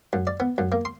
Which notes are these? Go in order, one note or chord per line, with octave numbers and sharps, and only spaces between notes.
F#2
D5
B3
F#2
A#3
C6